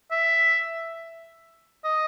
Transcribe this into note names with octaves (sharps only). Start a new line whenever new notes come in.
E5
D#5